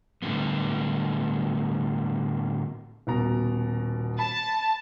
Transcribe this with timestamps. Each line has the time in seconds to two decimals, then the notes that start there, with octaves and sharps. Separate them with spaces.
0.22 A2 D3 G3 B3
3.07 D#1 B2 A#5
4.19 A5 B5